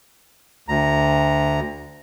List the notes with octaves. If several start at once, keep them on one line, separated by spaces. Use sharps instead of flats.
D2 A#5